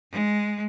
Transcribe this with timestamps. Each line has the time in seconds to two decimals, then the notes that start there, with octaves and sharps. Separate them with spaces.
0.11 G#3